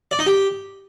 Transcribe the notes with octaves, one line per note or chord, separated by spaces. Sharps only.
D5
D#4
G4